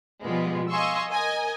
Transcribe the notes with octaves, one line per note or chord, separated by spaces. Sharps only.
B2 F3 G3 G#3 B3 F4
D#5 F5 G#5 C6 C#6 E6
A#4 D#5 G#5